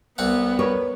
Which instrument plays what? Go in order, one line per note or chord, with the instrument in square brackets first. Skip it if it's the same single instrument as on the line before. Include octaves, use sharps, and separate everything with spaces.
[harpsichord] C2 C4 F#5 [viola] B3
[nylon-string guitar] A#4 B4 C#5